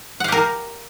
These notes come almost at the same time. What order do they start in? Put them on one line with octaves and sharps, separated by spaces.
F#5 F5 G4 A#4